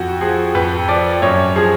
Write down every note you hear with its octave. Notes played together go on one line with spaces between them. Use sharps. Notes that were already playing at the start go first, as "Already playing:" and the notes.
Already playing: F2 F#4
F3 G#4
F2 B4
F3 D5
F#2 C#5
F3 G#4